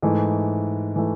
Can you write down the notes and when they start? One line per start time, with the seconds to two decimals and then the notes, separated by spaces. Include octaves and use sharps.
0.02 G#2 E3 A3
0.96 E3 A3